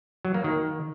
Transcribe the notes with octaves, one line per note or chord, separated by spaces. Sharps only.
F#3
A#3
D#3